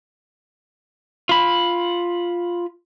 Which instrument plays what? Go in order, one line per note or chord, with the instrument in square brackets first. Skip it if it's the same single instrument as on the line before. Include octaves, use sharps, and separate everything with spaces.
[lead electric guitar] F4 B5